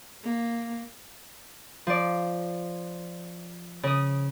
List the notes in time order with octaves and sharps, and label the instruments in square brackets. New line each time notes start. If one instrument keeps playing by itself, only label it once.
[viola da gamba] A#3
[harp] F3 D5
C#3 D#6